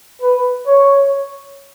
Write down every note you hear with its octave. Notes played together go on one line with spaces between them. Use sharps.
B4
C#5